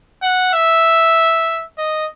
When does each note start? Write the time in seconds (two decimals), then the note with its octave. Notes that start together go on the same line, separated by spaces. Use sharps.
0.22 F#5
0.53 E5
1.78 D#5